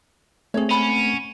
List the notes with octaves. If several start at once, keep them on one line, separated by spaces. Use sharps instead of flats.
A3 C4 G#4 C#5
C#4 F#5 B5